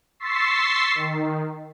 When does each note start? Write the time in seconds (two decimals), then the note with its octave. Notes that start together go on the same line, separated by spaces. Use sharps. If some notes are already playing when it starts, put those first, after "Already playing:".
0.20 C6 C#6 E6 A6 B6 C7
0.95 D#3